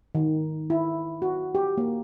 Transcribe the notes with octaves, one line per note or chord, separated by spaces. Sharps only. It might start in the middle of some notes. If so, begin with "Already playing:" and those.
D#3
E4
F#4
G4
A#3